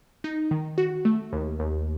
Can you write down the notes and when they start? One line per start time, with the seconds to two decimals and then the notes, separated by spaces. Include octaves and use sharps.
0.24 D#4
0.51 D#3
0.78 F#4
1.05 A3
1.33 D#2
1.59 D#2